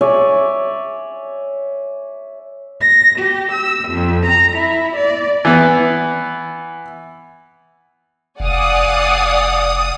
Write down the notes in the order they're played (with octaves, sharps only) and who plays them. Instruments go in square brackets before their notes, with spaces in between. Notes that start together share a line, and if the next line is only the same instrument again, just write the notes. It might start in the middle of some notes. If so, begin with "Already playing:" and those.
[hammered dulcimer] C#5 D5 E5 G#5
[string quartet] A#6
G4
E6
F2
A#5
E4
D5
[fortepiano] E3 B3
[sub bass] F1 [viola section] D5 [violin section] F5 F#5 G#5 [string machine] D#6